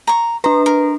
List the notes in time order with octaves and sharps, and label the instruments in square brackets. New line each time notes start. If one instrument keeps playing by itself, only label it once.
[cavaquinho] A#5 C#6
[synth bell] D4 B4 [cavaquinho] A#5
[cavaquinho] A#4